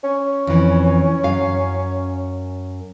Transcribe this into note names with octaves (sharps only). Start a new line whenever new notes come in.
C#4
F2 E3
F#2 F5